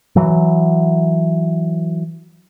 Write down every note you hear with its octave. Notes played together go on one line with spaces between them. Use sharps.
E3 F#3